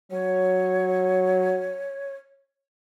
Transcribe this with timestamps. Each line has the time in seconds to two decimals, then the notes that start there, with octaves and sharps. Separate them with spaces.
0.12 F#3 C#5